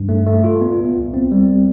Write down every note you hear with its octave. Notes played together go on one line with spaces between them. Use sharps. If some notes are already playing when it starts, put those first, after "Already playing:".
Already playing: G2
A3
A3
F4
B3
C2
C2
C4
G3